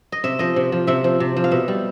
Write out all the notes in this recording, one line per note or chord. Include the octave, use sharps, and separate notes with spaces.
D#5
C3 E5
F3 D#5
C3
F3
C3 E5
F3
C3
F3
F5
B2 E5
G3